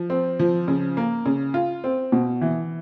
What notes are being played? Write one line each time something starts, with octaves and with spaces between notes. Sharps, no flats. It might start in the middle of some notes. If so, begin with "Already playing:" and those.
Already playing: F3
C4
F3
C#3
A#3
C#3
F4
C4
B2
E3